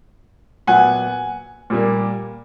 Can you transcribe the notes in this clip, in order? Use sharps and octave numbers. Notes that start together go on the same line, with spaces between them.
A#2 F#3 B3 F#5 G#5
A#2 G3 A#3